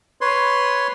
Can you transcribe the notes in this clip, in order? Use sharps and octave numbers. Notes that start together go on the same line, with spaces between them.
B4 C#5 C6